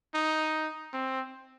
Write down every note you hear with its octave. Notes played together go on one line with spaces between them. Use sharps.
D#4
C4